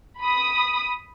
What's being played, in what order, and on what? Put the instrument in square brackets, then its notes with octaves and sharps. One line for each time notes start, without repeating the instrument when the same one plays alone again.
[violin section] B5 D#6